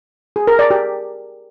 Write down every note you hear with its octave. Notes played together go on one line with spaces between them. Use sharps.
G#4
A#4
D5
G4